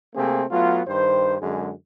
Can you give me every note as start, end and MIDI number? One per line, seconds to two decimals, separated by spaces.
0.15 0.44 48
0.15 0.44 57
0.15 0.44 58
0.15 0.44 60
0.15 0.44 68
0.51 0.81 54
0.51 0.81 57
0.51 0.81 59
0.51 0.81 65
0.87 1.36 43
0.87 1.36 51
0.87 1.36 72
1.41 1.71 42
1.41 1.71 50
1.41 1.71 56